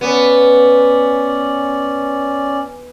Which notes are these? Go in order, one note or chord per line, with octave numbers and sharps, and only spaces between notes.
B3 C#4 D5